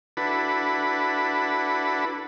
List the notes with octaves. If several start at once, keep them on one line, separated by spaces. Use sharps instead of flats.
D4 E4 F#4 A4 B4 B5